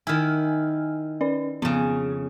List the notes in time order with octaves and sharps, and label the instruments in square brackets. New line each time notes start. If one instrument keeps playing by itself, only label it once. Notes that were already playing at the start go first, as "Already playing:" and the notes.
[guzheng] D#3 E4 [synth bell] G#5 F6
[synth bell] C#4 B4 D5
[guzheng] F2 C#3 [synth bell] B3